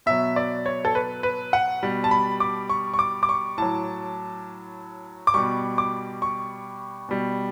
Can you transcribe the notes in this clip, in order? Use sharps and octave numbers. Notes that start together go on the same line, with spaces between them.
B2 F#3 E5
D5
C#5
A4
B4
B4
F#5
B2 G3
A5
B5
D6
C#6
C#6
D6
D6
C#6
A2 F#3 A5
D6
B2 G3 C#6
D6
C#6
B2 G3